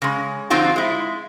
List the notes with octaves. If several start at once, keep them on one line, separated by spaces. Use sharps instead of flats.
C#3 G#3
D3 F3 C4 D#4 F4 F#4
G#3 E4